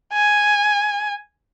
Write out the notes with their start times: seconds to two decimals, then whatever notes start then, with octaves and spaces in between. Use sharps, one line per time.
0.13 G#5